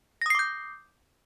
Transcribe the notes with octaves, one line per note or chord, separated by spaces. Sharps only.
D6 D#6 G6 A#6 C7